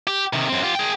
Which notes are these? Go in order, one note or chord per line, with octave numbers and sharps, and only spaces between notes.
G4
C3 D#3
F#2 C4
F4 G4
G#4 G5